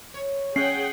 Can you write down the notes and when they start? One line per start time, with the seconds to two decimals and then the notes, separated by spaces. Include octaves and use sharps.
0.14 C#5
0.56 C#4 G#4 F#5 G5 C7